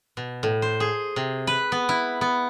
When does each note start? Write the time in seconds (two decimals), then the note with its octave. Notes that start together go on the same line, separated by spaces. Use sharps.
0.17 B2
0.43 A2
0.62 C5
0.80 G#4
1.16 C3
1.47 B4
1.72 B3
1.89 E4
2.21 B3